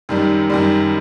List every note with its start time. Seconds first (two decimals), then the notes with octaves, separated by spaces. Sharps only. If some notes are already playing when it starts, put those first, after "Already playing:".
0.09 F#2 D#3 G3
0.50 F#2 D#3 G3